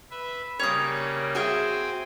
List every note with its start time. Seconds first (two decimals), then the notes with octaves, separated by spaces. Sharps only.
0.11 B4 E5
0.60 C#3 G3 A#3 C#5 D#6
1.35 C4 F#4 G#4 E5 G5 G#5